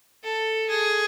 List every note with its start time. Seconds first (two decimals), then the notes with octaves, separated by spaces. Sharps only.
0.24 A4
0.70 G#4